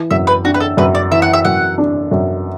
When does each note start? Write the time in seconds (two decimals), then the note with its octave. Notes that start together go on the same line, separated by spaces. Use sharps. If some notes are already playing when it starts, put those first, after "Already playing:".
Already playing: E3
0.11 F#2 E5
0.27 B4
0.44 D4 F#4
0.54 B4
0.60 A4
0.77 F#2 B4
0.95 D5
1.11 E3 E5
1.22 F#5
1.33 E5
1.45 F#2 F#5
1.78 D4
2.11 F#2